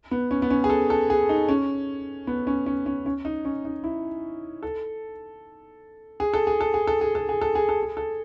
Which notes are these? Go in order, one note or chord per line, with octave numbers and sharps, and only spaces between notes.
B3
C#4
B3
C#4
G#4
A4
A4
G#4
D#4
C#4
B3
C#4
C#4
C#4
C#4
D#4
C#4
D#4
E4
A4
G#4
A4
G#4
A4
G#4
A4
G#4
A4
G#4
A4
G#4
A4
G#4
A4